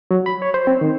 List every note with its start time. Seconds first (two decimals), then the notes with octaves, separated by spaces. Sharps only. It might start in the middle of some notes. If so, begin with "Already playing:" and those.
0.11 F#3
0.26 B5
0.42 C#5
0.54 C5
0.67 C4
0.81 D#3